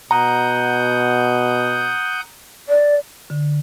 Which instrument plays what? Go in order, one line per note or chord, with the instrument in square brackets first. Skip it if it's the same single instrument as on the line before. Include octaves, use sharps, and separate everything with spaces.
[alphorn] B2 [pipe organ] F#5 D#6 G6 [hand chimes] A#5
[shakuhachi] D5
[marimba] D3